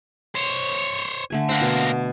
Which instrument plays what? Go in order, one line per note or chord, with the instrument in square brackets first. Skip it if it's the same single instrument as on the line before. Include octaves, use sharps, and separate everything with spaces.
[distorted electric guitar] C5 C#5
[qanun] D3 A3 G#5
[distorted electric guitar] A#3 C4 [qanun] E5 F#5
[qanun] B2